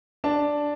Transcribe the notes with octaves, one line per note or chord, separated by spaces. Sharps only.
D4 A5